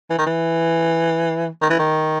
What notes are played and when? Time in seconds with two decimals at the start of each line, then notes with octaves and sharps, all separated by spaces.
0.10 E3
0.18 D#3
0.26 E3
1.62 D#3
1.70 E3
1.79 D#3